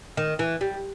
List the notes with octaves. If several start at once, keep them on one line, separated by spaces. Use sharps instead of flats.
D#3
E3
G3